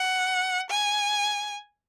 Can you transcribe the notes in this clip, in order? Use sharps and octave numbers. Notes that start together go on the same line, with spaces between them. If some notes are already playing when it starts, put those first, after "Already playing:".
Already playing: F#5
G#5